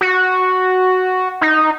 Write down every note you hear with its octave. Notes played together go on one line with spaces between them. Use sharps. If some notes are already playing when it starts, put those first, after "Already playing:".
F#4
D#4